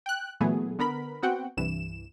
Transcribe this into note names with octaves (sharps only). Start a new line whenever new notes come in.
G5 F#6
A#2 E3 F#3 A3 B3 G#4
D3 B3 A#4 B5
B3 C4 F#4 F#5 G5
C2 G2 E3 E7